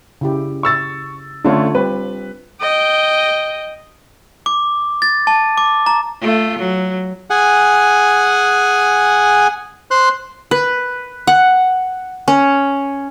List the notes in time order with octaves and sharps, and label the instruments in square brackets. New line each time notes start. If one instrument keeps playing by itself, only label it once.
[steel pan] C#3 E4 G4
[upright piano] C#6 E6 A6
[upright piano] D3 A3 C#4 [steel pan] D4 F4 C#5
[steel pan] G3 C4 G4 [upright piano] B4
[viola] D#5 G5
[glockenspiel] D6
A6
A5
D6
A#5
[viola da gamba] A3 F4
F#3
[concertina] G#4 F#5 G#5
C5 C6 F#6
[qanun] B4
F#5
C#4